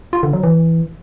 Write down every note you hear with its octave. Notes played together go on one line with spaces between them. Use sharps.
F4
D3
F#3
E3